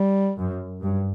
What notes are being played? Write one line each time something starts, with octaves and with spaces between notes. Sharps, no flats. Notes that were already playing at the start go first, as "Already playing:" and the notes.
Already playing: G3
F#2
G2